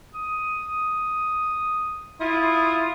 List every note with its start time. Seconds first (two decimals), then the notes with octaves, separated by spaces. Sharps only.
0.14 D#6
2.20 E4 F4 D#6